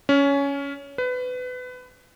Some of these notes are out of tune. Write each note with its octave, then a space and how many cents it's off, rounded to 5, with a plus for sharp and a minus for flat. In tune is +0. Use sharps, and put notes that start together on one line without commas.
C#4 +15
B4 +25